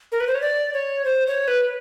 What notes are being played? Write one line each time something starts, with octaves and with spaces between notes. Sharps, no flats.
A#4
B4
C5
C#5
D5
C#5
C5
C#5
B4